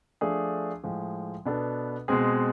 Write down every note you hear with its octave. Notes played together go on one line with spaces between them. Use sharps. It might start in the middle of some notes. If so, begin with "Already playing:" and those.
F3 A3 D4 G#4
A2 F3 G#3
B2 B3 D4 A4
B2 G#3 C4 G#4